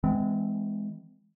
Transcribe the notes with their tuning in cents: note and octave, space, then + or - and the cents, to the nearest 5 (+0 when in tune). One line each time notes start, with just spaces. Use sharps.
E3 +0 G#3 +0 C4 -40